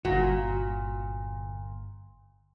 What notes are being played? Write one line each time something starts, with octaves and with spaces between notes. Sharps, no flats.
G1 A#2 F#4